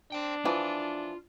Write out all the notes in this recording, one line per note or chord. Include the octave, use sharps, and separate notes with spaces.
D4 C5 G5
E3 F3 F4